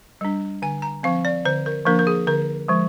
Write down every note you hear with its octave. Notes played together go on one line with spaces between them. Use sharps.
G3 D4
D3 G#5
A#5
F3 C4 F5
D5
D3 C5
A#4
F3 A#3 D4 A#4
A#4
G#4
D3 A#4
F3 G#3